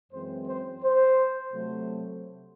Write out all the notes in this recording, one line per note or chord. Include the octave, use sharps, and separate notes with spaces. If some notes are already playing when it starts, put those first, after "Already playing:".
F#2 E3 G#3 C4 C5
C5
C5
C3 F#3 A3